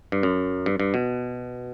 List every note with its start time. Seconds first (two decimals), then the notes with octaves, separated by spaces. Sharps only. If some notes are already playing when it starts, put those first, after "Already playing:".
0.12 G2
0.23 F#2
0.66 G2
0.80 G2
0.94 B2